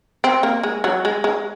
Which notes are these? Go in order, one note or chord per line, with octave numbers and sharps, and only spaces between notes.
C4
A#3
G#3
F#3
G#3
G#3